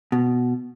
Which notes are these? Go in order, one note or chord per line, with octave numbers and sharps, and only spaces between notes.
B2